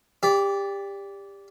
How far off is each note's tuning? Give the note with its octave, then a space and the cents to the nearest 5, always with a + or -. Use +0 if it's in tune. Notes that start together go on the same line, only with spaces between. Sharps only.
G4 +20 D5 -15